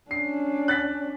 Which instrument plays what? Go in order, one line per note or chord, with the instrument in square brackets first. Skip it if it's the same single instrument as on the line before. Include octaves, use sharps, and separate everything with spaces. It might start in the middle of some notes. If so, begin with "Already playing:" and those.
[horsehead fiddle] C#4 D4 [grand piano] C7
[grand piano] F#6 A6 B6